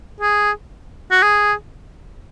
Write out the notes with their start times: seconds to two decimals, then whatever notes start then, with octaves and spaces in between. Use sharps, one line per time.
0.21 G#4
1.11 F#4
1.22 G#4